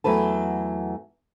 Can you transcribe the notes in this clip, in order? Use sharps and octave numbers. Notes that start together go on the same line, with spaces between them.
E2 F#3 A3 B4 A5